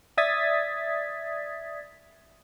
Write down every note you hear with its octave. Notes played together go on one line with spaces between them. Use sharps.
D5 E5 D#6 G#6 A6 B6